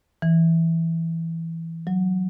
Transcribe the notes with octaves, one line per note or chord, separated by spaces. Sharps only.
E3
F#3